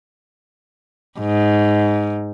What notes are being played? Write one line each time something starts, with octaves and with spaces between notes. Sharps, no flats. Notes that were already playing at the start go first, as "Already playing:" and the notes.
G#2